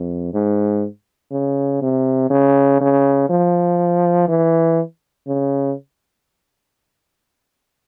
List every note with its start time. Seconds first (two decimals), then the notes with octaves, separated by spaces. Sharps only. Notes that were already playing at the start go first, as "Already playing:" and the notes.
Already playing: F2
0.33 G#2
1.31 C#3
1.82 C3
2.30 C#3
2.81 C#3
3.29 F3
4.28 E3
5.27 C#3